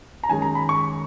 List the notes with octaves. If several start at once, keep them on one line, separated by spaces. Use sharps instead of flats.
A#5
F#2 D#3 G#3 G#5
A#5
B5
C#6